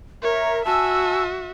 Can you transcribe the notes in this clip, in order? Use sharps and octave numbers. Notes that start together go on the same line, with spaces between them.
A#4 C#5 E5
F#4 E5 G#5 A5 E6